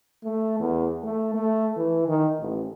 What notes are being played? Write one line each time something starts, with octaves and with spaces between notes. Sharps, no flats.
A3
E2
A3
A3
E3
D#3
A1